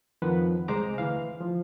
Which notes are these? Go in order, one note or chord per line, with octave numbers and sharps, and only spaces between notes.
F2 D#3 F3 B4 F#5
C2 G#3 C5 A#5 D6
D2 E3 F5
F3